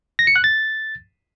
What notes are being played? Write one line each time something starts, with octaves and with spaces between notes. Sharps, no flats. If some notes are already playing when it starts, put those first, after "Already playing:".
A#6
C#7
F#6
A6